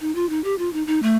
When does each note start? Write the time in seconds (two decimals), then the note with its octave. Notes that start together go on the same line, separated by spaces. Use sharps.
0.01 D#4
0.15 F4
0.29 D#4
0.44 G4
0.58 F4
0.73 D#4
0.87 D#4
1.03 A3